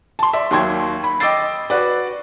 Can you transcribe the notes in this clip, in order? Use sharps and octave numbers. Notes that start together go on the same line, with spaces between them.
A5 C6
D5 E5
D#2 F#3 G5 C6 G#6
B5
D#5 G5 D6 E6 A6 C7
F#4 B4 D5